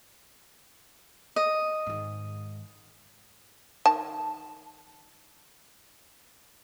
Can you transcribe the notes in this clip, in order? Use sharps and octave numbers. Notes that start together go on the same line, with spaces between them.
D#5
G#2 D#3
D#3 A5